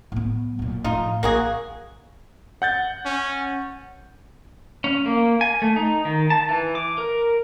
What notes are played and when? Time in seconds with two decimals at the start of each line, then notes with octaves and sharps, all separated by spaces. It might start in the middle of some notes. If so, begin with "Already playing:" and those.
0.12 A2 B3
0.59 F#2 A#2
0.84 A2 F3 D#4 F4
1.23 A#1 A#3 F#4 G#4
2.62 F#5 G6 A6
3.05 C#4
4.84 C#4
5.06 A#3
5.41 G#5
5.62 A3
5.76 D#4
6.05 D#3
6.30 A5
6.49 E3
6.75 D6
6.98 A#4